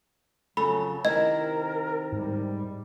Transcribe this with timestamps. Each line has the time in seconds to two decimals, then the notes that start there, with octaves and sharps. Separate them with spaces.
0.57 F2 C#3 F#3 A4 B5
1.05 C3 D#3 E4 A#4 D#5
2.12 G#2 G3